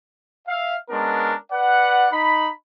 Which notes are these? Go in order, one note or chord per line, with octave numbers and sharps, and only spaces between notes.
E5 F5
G#3 B3 C#4 D4 A#4
B4 D5 F#5
D#4 B5